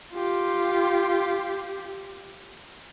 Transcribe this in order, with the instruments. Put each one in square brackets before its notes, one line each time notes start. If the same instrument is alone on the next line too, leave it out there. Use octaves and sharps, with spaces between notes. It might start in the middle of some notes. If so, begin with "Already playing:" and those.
[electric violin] F4 G4